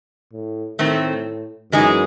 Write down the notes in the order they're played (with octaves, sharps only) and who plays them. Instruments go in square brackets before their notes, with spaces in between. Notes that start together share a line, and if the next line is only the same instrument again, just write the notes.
[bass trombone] A2
[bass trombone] A2 [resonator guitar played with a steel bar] D#3 A3 C4
[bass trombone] F#2 [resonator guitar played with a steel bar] E3 G#3 D#4 G#4